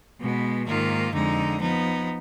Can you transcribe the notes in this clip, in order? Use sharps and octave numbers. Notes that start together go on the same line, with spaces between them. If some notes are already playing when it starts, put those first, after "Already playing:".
B2 G#3 B3
G#2 D#3 A#3 F4
F2 D3 G#3 D#4
F3 B3 D#4